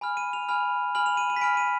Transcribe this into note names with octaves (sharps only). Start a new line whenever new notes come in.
G#5 B5 F6
D#7
F7
G#5 B5 F6
G#5 B5 F6 F#7
F7
D#7
D#7
B6
G#5 B5 F6 D7
D#7